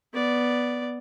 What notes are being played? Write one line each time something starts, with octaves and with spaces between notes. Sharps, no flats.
B3 D5